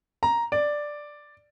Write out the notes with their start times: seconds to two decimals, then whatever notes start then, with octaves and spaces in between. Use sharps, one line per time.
0.23 A#5
0.52 D5